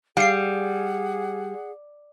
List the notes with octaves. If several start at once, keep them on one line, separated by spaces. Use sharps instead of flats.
G3 G#4 F5 F#5 C7